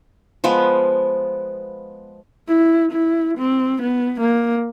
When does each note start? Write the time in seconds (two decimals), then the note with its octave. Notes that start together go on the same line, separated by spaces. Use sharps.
0.44 F3 G#3 B3
2.48 E4
2.91 E4
3.38 C4
3.82 B3
4.20 A#3